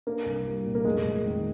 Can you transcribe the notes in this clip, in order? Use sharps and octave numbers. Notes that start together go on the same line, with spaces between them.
A#3 D4
C2
G3
A#2
A#3
F1 G#3
F1
D#3